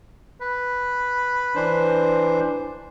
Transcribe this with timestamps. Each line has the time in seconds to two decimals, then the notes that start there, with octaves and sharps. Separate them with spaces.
0.41 B4
1.55 E3 D4 C5